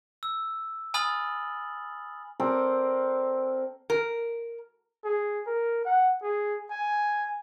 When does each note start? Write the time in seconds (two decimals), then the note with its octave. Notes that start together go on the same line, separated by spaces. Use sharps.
0.23 E6
0.94 G#5 B5 D#6 F6 A6 F#7
2.40 C4 A4 A#4 D5
3.90 A#4
5.04 G#4
5.46 A#4
5.85 F#5
6.22 G#4
6.71 G#5